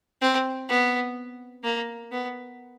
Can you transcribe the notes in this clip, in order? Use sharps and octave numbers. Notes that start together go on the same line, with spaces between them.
C4
B3
A#3
B3